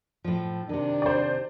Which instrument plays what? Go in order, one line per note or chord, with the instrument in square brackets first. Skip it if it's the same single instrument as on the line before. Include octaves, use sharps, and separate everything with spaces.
[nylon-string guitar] A2 F3
[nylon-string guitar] C3 D#3 [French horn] D4
[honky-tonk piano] C5 D5